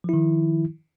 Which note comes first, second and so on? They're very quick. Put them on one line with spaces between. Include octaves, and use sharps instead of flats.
F3 E4 D#3